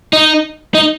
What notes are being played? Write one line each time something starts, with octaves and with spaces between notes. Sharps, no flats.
D#4
D#4